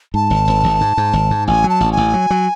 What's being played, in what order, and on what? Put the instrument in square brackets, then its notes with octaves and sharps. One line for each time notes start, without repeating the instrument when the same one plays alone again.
[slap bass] G#2 [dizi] A5
[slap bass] G#1
G#1
G#1
G#2
G#2
G#1
G#2
[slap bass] A1 [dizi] G#5
[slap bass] F#3
[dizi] A5
[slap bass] A1
[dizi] G#5
[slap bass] A1
F#3
F#3